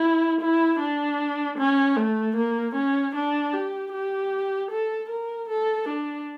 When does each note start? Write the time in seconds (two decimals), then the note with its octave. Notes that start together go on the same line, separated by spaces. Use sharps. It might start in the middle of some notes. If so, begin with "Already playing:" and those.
Already playing: E4
0.41 E4
0.79 D4
1.58 C#4
1.97 A3
2.36 A#3
2.75 C#4
3.15 D4
3.53 G4
3.93 G4
4.71 A4
5.09 A#4
5.49 A4
5.88 D4